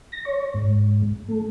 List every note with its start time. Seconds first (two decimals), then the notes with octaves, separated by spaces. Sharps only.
0.12 A#6
0.25 C#5
0.54 G#2
1.29 A3